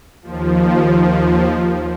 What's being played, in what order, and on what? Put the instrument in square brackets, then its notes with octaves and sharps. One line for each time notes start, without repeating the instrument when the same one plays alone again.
[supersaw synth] D#2 F3